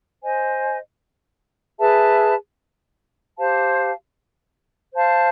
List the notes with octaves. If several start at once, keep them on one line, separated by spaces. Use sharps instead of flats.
C5 D#5 G#5
G#4 B4 E5 A5
G4 C5 F5 A5
C5 F5 A5